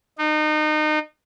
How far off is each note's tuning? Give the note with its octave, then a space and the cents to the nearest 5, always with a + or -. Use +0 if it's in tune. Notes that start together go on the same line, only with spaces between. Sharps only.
D#4 -30